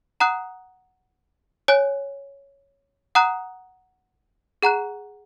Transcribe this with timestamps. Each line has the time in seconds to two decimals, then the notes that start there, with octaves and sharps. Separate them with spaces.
0.20 F#5 A#5 D#6 F#6
1.68 C#5 G#5 F#6
3.15 F#5 A#5 D#6 F#6
4.63 G#4 F#5 A#5 F#6